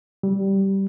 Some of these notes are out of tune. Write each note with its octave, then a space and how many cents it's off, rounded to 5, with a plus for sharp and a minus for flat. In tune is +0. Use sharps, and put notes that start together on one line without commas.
G3 -10